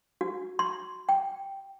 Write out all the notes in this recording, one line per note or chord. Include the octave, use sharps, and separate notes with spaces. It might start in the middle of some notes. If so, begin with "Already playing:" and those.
F#4
C6
G5